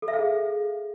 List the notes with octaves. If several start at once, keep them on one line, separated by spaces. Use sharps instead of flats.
A4
E5
F5
G#4